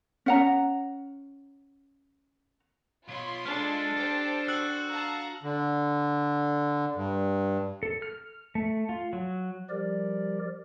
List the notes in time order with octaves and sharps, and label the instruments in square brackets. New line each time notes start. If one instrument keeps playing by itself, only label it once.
[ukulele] C#4 F#5 A#5
[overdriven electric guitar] B2 C#5 [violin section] F4 B5 C6
[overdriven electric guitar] G#3 [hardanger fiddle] D4 A4 [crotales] F6
[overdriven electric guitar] G4 [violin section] C5 G5
[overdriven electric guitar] F#4 [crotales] E6 F#6 F#7
[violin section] F5 A5 A#5
[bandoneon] D3
G2
[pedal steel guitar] A4
F6
A3
F4
F#3
[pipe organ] F3 G3 G4 A#4 D5